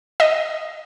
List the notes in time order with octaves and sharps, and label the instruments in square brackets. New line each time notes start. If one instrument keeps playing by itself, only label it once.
[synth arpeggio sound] D#5